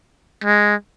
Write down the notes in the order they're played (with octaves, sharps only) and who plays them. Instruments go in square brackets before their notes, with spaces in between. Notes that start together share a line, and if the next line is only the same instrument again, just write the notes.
[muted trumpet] G#3